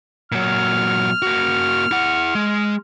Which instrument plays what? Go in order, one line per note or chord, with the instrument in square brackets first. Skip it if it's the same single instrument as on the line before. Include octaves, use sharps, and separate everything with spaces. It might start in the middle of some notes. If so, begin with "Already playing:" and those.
[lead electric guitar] A#2 F#3 [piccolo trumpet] F6
[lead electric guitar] A#3 F#4
E4 F#5
G#3